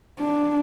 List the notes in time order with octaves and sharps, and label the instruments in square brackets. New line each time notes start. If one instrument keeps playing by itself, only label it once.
[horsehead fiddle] D4